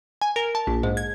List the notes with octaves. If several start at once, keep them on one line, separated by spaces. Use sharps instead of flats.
G#5
A#4
A5
A#1
G#2
G#6